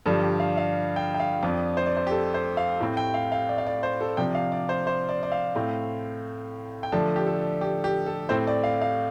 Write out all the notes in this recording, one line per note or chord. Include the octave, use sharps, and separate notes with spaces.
G2 D3 F3 D4 A4
G4
F5
F5
G5
G5
F5
F2 F3 D4 D5
C5
D5
C5
G4
A4
C5
F5
A2 A3 C4
G5
F5
F5
D5
F5
D5
C5
A4
C3 F3 D4 G5
F5
D5
C5
C5
D5
D5
F5
A2 A3 C4
G5
D3 F3 A3 D4 A5
G4
A4
G4
G4
A4
A2 A3 C4 C5
D5
F5
F5